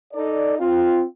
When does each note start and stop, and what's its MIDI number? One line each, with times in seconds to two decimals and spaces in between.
0.13 0.55 63
0.13 0.55 69
0.13 0.55 74
0.59 1.02 60
0.59 1.02 65